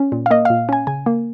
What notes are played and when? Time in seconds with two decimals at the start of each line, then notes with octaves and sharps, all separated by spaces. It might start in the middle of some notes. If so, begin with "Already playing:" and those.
Already playing: C#4
0.12 A#2
0.26 F5
0.31 A#3 D#5
0.45 A#2 F5
0.69 C#4 G#5
0.87 C#3 G#5
1.06 A#3